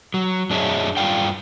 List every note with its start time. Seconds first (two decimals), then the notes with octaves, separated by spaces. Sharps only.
0.14 F#3
0.50 F#2 D4 G#4 C#5 D#5 E5
0.97 G2 F4 D5 F5 G5